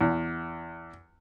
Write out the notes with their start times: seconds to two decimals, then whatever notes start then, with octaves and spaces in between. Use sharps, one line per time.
0.01 E2